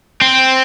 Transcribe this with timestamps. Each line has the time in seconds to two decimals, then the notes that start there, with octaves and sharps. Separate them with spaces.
0.22 C4